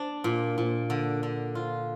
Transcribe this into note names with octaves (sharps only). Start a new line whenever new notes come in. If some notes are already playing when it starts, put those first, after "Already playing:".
Already playing: D4
A#2
A#2
D3
D3
F4